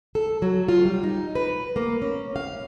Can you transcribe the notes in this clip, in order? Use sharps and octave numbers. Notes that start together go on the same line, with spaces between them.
A4
F#3
F4
G3
D#4
B4
A#3
C#4
F5